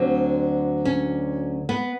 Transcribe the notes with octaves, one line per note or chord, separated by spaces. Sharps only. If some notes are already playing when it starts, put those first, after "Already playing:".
Already playing: D2 D3 F#3 C4
C#4
B3